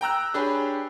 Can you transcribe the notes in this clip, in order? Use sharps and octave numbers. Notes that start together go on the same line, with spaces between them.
G5 A#5 E6 F#6
D4 G4 G#4 B4 C#5 B5